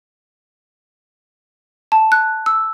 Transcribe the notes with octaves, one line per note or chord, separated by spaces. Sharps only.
A5
F#6
E6